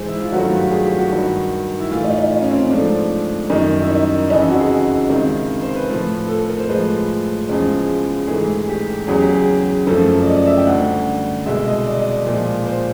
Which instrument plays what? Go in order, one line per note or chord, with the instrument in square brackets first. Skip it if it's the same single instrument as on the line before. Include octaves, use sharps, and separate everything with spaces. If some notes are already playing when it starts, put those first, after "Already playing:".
Already playing: [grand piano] G#2 E3 G#3 C5
E4
F4
G2 D#3 F#3 A3 F#4
F4
G4
G#4
G4
F#4
G2 D#3 G3
E4
A2 E3 A3 F4
D#4
D#4
D#4
C#4
C4
C#4
G#2 F3 A3 D4
F#2 D#3 G3 D#4
E4
D#4
F2 C#3 E3 D#4
E4
F#4
G#4
C#2 C3 D#3
C5
B4
A2 F3 A3
A4
A4
A#4
C5
A2 F3 G#3 B4
E2 C#3 F3 G#3
G#2 E3 A3 G#4
G4
E2 C#3 F#3 G#4
G4
G#4
F#2 C#3 F3 A3 A4
D5
D#5
D5
E5
G5
D2 D3 G3 F#5
C2 B2 G#3 E5
D#5
D5
D#5
D5
A#2 F3 G#3
C5